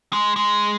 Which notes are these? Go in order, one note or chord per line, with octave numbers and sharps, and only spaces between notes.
G#3
G#3